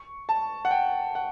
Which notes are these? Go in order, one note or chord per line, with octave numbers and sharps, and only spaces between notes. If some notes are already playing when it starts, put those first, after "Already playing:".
Already playing: C#6
A5
F#5
G5
F#5